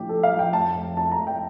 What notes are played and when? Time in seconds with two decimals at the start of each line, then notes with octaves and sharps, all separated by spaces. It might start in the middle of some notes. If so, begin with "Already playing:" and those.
Already playing: A1 D2 F3 G4
0.09 A3 A4
0.23 F5
0.32 F3
0.39 G5
0.53 F1 A5
0.75 F1
0.97 F2 A5
1.12 A#5
1.20 F1
1.27 G5